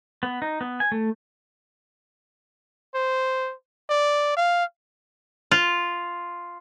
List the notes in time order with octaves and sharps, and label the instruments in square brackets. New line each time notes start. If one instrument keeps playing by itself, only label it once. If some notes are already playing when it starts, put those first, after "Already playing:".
[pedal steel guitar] B3
D#4
B3
G#5
A3
[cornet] C5
D5
F5
[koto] F4